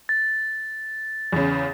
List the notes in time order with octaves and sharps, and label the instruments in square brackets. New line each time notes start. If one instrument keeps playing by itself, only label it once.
[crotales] A6
[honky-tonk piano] E2 C#3